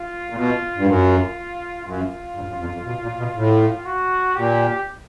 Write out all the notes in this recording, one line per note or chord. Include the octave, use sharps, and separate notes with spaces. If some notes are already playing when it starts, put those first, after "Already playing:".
Already playing: F4
A#2
B2 F4
G2
F#2 F4
F#2 F4
G2
F#2
F2
F2
B2
A#2
B2
A2
F#4
A#2 G4